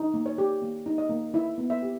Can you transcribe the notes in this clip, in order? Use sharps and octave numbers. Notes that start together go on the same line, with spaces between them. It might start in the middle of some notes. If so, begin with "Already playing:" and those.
Already playing: D#4
A#3
C#5
G4
A#3
D#4
D#5
A#3
E4 E5
B3
E5
G4